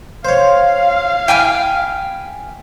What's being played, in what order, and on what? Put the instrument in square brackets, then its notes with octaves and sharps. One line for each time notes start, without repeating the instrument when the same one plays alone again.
[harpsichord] C5 C#5 [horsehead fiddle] F5
[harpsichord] E4 [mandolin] G5 G#5 F6